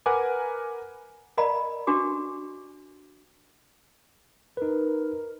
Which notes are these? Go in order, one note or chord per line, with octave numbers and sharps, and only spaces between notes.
A#4 B4 F#5 G#5 D6
A#4 D5 D#5 F5 A#5 B5
D4 F#4 G4 D6
D#4 A#4 B4